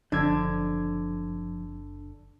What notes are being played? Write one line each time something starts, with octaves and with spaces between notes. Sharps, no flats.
F#1 F2 D3 D4 G#6